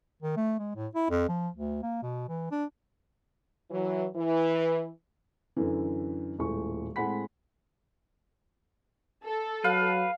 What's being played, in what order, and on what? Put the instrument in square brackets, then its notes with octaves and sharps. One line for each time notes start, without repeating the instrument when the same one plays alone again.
[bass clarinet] D#3
A3
G#3
A2
E4
F2
F3
D2
A#3
B2
E3
D4
[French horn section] E3 F#3
E3
[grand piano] F#2 D3 E3
D#1 A2 G#3 C#6
A2 G#3 C4 F#5 B5 B6
[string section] A4
[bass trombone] F#3 [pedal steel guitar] B4 [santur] F5